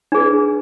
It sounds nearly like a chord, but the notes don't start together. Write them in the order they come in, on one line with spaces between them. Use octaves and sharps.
D4 G#4 B4